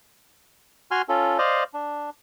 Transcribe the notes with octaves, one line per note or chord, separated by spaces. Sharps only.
F#4 G#5 C6 F6
C#4 F4 A4
C5 D5 D#5 F5
D4